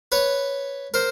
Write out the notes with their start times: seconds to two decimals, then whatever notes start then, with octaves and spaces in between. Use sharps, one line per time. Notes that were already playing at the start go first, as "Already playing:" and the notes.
0.12 B4 C#5
0.94 A#4 C5